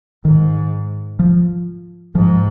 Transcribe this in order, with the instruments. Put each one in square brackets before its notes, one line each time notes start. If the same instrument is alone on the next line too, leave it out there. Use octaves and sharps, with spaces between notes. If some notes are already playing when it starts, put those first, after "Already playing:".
[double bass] G#2 [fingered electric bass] D#3
[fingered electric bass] F3
[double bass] G#2 [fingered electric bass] F3